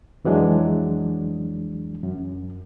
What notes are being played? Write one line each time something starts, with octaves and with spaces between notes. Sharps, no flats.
F2 E3 F#3 G#3 D4
F#2